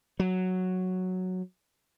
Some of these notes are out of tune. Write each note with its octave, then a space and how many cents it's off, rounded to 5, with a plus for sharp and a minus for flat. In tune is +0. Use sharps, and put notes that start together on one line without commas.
F#3 -5